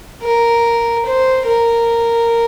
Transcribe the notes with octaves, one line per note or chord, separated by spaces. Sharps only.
A#4
C5
A#4